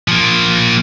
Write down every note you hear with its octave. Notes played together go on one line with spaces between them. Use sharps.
F3 A#3